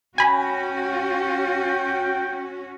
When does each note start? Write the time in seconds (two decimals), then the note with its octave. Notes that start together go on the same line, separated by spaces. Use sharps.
0.18 C#4 F#4 G5 G#5 B5